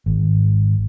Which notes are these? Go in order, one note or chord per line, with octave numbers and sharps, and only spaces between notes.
G#1